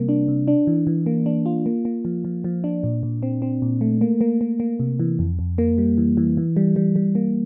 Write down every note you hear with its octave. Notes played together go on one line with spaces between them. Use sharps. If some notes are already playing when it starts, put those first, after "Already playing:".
Already playing: C3 G3 A#3
D4
C3
D4
E3
E3
A#3
D4
F4
A#3
A#3
F3
F3
F3
D4
A#2
A#2
C4
C4
A#2
A3
A#3
A#3
A#3
A#3
C3
E3
F2
F2
A#3
G3
E3
E3
E3
G3
G3
G3
A#3